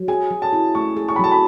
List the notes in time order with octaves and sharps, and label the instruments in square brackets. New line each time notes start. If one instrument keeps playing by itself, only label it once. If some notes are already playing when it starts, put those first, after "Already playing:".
Already playing: [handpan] F#3
[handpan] G#4 [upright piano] G#5
[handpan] F#3
[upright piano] A5
[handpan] E4
[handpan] A3 [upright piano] C#6
[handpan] G#4
[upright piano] C#6
B5
[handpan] F#3 [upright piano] A5
[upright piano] B5